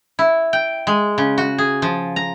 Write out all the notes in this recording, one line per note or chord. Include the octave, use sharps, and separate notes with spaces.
E4
G5
G#3
C#3
F#4
G#4
F3
A#5